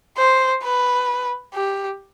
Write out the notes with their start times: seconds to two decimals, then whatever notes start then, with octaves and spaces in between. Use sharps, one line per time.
0.18 C5
0.63 B4
1.54 G4